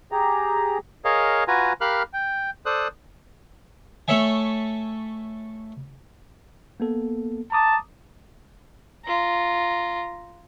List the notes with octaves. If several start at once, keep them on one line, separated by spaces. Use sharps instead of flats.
G4 G#4 A#5
G#4 A#4 C#5 D#5 F5
F4 F#4 B4 G#5 A#5
G4 A#4 F5 B5 F6 F#6
G5
A4 C5 D5 D#6 F#6
A3 A4 C#5 E5 G#5
A#3 B3 A4
A5 A#5 D6 D#6
F4 A#5